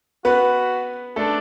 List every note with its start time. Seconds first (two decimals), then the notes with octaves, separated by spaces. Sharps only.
0.25 B3 F#4 B4
1.16 A3 D4 A4